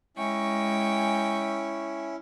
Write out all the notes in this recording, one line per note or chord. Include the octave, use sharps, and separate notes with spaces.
G#3 C#4 E4 G5 C#6